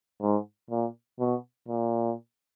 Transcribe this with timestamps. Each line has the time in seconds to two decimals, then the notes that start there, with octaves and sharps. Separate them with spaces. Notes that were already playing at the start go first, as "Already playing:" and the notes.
0.22 G#2
0.71 A#2
1.20 B2
1.68 A#2